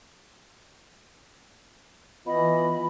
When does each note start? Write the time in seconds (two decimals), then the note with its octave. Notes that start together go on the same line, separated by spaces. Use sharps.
2.27 E3 B3 F4 D#5 B5